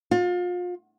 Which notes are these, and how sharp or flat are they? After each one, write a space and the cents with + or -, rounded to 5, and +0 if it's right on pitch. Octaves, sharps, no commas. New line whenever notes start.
F4 +35